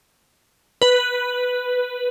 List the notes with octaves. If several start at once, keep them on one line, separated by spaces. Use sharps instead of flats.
B4